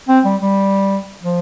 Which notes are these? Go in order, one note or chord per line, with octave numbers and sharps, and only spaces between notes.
C4
G3
G3
F3